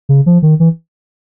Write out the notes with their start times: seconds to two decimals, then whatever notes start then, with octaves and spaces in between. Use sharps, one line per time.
0.09 C#3
0.26 F3
0.42 D#3
0.60 E3